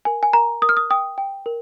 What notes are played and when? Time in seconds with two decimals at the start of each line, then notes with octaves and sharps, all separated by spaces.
0.05 A#4 G#5
0.23 G#5
0.33 A#4 A#5
0.62 A#4 D#6
0.69 F6
0.77 D#6
0.91 G5 D#6
1.18 G5
1.46 A#4